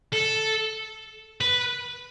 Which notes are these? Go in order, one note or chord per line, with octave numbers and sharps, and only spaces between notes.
A4
B4